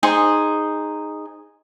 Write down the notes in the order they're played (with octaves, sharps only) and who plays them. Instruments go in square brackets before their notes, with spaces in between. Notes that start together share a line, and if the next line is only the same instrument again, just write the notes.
[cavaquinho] D#4 G#4 C5